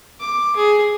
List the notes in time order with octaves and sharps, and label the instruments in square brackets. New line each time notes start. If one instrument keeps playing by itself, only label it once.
[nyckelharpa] D6
G#4